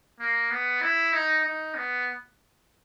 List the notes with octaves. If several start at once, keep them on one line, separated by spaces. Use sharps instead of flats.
A#3
B3
E4
D#4
D#4
B3